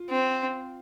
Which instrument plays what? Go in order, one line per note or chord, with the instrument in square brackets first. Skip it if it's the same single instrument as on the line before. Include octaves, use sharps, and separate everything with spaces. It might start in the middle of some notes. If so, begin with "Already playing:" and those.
Already playing: [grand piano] F4
[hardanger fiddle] C4